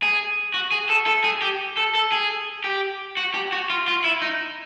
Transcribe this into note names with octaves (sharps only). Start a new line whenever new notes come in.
G#4
F#4
G#4
A4
A4
G#4
G4
A4
A4
G#4
G4
F#4
G4
F#4
F4
F4
E4
D#4